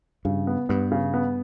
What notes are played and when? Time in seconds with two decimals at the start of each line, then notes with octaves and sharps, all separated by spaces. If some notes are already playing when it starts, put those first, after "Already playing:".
0.25 G2 C#3
0.47 B3
0.69 G2 B3
0.92 C#3
1.14 B3